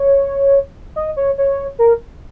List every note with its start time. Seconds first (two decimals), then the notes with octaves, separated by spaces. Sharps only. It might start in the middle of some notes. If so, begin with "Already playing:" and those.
Already playing: C#5
0.96 D#5
1.17 C#5
1.38 C#5
1.79 A#4